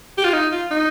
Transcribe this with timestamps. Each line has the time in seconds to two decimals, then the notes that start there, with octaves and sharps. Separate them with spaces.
0.18 G4
0.24 F4
0.33 D#4
0.52 F4
0.71 D#4